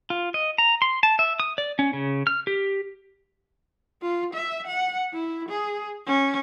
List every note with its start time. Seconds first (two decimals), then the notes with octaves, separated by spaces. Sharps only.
0.10 F4
0.34 D#5
0.58 A#5
0.82 C6
1.03 A5
1.19 E5
1.40 D#6
1.58 D5
1.79 C#4
1.93 C#3
2.27 F6
2.47 G4
4.02 F4
4.34 E5
4.67 F#5
5.13 E4
5.49 G#4
6.06 C#4